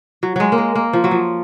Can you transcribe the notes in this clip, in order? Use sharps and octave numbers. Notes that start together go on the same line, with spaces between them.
F#3
F#3 G#3
A#3
G#3
A#3
F3
F#3
F3